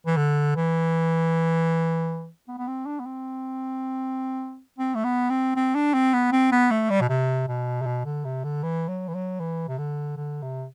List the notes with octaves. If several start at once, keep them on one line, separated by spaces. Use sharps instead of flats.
E3
D3
E3
B3
B3
C4
D4
B3
C4
C4
A3
B3
C4
C4
D4
C4
B3
C4
B3
A3
G3
B2
C3
B2
C3
B2
D3
C3
D3
E3
F#3
E3
F#3
E3
C3
D3
D3
C3